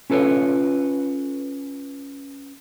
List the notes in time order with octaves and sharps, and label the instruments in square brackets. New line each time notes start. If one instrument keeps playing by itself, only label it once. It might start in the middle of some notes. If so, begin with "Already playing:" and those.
[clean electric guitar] C#4 F4 A4 B4 C#5